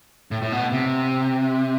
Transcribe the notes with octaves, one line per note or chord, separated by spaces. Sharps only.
A2
A2
B2
C3